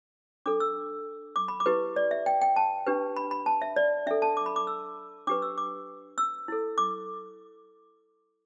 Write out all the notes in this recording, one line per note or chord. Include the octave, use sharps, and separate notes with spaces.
D4 A4 D6
E6
D6
B5
D6
E4 G4 B4
D5
E5
G5
G5
A5
D4 G4 B4
B5
B5
A5
E5
D5
D4 A4 E5
A5
D6
B5
D6
E6
D4 G4 B4 D6
E6
D6
E6
E4 A4
D6